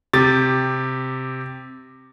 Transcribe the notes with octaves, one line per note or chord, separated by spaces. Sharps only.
C3 G4 A6